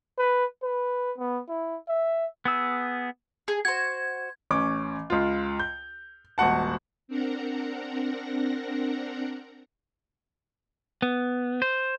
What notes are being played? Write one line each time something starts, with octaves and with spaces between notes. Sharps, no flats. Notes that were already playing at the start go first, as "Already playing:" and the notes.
B4
B4
B3
E4
E5
B3 G#4 E6
G#4
F#4 C5 G#6
A1 C#4 D6
C#2 F4
G6
D#1 G#1 F#4 F#5 A5
C4 D4 A#4 F#5 A#5
B3
C5